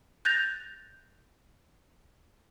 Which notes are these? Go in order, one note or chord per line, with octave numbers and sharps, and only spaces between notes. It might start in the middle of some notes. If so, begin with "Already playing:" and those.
F#6 G6 A6 A#6 F7